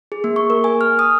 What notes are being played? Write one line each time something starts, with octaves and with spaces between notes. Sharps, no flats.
G#4
A#3
C#6
A#4
G#5
F6
D#6